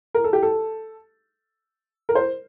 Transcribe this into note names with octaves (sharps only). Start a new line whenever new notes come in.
A#4
A4
G4
A4
A#4
C5